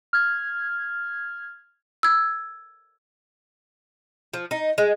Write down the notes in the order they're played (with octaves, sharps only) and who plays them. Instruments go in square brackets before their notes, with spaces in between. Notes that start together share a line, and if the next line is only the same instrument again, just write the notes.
[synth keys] F6 G#6
[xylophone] E6 G#6
[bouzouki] F3
D#4
G#3